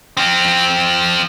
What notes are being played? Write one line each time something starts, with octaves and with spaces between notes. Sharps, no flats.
F3 C4